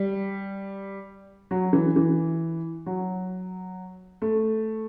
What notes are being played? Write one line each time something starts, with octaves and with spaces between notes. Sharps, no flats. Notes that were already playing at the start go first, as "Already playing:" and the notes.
Already playing: G3
F#3
E3
E3
F#3
A3